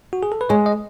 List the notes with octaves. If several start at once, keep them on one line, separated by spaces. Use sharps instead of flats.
F#4
G#4
A4
B4
G#3 C#5
D#5